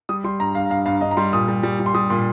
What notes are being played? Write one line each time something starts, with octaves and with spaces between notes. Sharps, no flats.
G3 D#6
G3 C6
G2 A#5
G2 F5
G2 F5
G2 F5
G2 D#5
A#5
G3 C6
A#2 D#6
G3
G3
G3
C6
G3 D#6
A#2